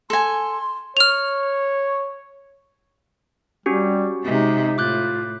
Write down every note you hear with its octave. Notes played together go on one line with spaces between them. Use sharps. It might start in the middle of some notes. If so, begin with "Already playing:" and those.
A4 G#5 C6
C#5 F6 F7
G3 C#4 F#4 G4
C3 G#3 D#4
A2 F4 D6 F#6 G6